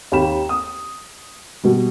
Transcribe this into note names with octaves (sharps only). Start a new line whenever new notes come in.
D#2 G4 G5 B5 E7
D#6
B2 G3